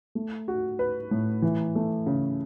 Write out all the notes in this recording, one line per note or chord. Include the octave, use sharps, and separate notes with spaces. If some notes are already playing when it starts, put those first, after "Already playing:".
A3
F#4
B4
A2
E3
A3
C#3